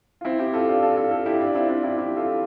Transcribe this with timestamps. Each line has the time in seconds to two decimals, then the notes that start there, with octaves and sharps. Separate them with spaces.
0.21 F4
0.25 C4 E4
0.39 E4 G4
0.53 F4 A4
0.69 D4 F4
0.82 F4 A4
0.97 F4 A4
1.11 F4 A4
1.26 E4 G4
1.40 D4 F4
1.55 C4 E4
1.69 D4 F4
1.83 E4 G4
1.98 E4 G4
2.16 F4 A4